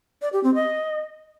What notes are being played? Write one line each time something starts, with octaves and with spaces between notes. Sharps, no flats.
D5
G4
C4
D#5